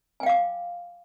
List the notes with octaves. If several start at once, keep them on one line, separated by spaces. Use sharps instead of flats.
F5 G5 G#5 D6